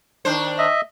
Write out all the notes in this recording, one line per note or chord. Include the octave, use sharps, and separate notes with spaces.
D#3 D4 C5
D#5 E5